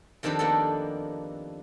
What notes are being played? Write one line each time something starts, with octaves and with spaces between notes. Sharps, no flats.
F2 D#3 C4 D4 G4 B5
A#3 B3 A4